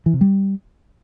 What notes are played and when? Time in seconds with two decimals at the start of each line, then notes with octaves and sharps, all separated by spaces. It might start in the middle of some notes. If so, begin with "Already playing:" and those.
0.06 E3
0.13 C3
0.21 G3